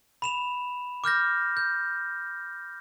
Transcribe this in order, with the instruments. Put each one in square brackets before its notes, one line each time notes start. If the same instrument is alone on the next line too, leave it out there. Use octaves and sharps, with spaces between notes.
[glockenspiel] B5 E7 F7
D6 F6 G6 A#6
G6